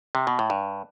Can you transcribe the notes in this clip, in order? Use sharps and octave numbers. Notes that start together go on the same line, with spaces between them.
C3
B2
A2
G2